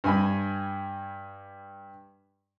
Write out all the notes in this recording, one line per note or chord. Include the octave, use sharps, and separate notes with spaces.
G2 G#5 B5